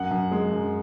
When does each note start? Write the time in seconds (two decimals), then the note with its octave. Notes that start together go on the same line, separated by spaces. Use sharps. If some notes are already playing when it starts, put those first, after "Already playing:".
Already playing: F#2 F#5
0.11 F#2
0.32 G#3
0.52 F#2